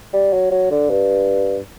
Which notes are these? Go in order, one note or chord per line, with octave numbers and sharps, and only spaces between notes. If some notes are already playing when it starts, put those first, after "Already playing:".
G3
F#3
F#3
D3
G2